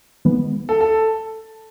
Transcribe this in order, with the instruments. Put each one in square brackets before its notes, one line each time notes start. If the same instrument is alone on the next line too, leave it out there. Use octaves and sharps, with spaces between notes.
[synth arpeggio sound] D#3 G#3 B3
[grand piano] A4
A4